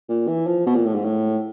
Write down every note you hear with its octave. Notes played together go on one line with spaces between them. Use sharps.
A#2
E3
F3
B2
A#2
A2
G#2
A2